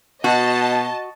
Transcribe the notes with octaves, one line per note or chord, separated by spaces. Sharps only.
B2 F#4 D#5 A5